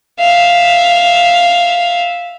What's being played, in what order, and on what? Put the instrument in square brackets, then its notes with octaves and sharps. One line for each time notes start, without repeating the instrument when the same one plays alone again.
[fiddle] E5 F5